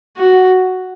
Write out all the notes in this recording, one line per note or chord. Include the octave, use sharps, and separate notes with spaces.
F#4